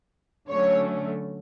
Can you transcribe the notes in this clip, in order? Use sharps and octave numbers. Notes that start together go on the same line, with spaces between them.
D3 F#3 A3 C#4 C#5